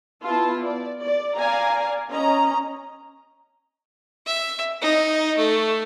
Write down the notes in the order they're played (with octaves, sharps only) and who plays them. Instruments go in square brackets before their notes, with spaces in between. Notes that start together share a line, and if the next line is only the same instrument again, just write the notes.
[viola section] B3 E4 F4 A5
D5
D5
D5 F5 G#5 A#5
C#4 D#5 A#5
[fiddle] E5
D#4
A3